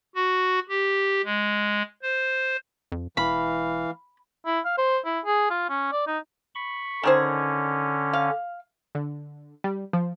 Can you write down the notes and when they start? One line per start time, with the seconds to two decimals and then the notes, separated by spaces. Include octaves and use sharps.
0.16 F#4
0.69 G4
1.25 G#3
2.03 C5
2.92 F2
3.17 E1 E3 F5 B5
4.46 E4
4.65 F5
4.78 C5
5.05 E4
5.25 G#4
5.50 F4
5.69 C#4
5.92 D5
6.07 D#4
6.55 B5 C#6
7.03 D3 D#3 C#4 G#4 C5
8.13 F5
8.95 D3
9.64 G3
9.93 F3